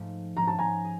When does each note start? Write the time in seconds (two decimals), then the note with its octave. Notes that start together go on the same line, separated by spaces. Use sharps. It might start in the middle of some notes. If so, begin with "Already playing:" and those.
Already playing: G#2 F3 A3
0.36 G#2 F3 G#3 C#4 A#5
0.47 A5
0.59 G#5 A#5
0.85 G#4